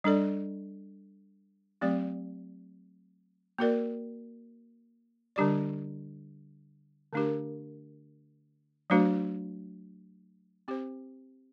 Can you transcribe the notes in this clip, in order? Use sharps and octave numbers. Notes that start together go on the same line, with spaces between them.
G3 D4 A4 D5
F#3 A3 C4 G4 D5
A#3 F#4 A#4 D5
D3 G3 D4 G4 D5
D3 A3 D4 G4 A#4
F#3 A3 D4 F#4 C5
C4 G4 C5